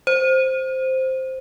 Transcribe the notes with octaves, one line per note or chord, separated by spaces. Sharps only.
C5